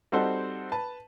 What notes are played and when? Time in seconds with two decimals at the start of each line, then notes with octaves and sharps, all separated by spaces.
0.12 G3 C4 D#4 F#4 A4 C5
0.72 B4 A5